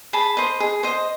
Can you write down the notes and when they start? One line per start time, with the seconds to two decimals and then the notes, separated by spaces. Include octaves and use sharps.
0.13 G#4 A5 B5
0.37 C5 D#5
0.60 G#4
0.83 C5 D#5